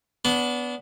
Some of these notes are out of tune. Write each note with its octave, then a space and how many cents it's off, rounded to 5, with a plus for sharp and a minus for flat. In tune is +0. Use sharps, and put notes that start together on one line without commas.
B3 +0 D4 -30